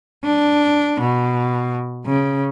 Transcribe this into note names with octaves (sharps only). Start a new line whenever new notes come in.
D4
B2
C#3